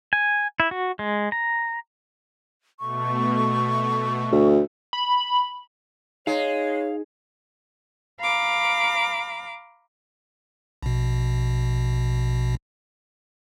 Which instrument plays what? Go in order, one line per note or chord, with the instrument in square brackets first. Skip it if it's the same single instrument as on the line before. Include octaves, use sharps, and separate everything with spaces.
[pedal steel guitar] G#5
E4
F#4
G#3
A#5
[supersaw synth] B2 A3 [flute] C#6
[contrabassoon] D2
[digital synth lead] B5
[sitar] G#3 [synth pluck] D#4 [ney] C#5 [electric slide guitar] F5
[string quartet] F5 A#5 B5 D6
[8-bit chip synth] A#1 B2